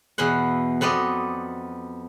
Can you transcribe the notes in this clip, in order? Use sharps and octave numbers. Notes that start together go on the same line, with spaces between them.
E2 B2 B3 F#5
F2 B3 D5 D#5